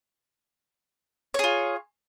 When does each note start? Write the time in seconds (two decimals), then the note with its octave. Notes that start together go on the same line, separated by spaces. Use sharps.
1.34 C#5
1.39 G#4
1.44 F4